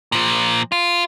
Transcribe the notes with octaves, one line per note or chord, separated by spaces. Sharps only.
A#2 F3
F4